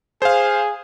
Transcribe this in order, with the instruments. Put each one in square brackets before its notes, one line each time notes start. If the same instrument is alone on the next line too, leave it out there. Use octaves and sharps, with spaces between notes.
[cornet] G#4 [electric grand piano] C5 F5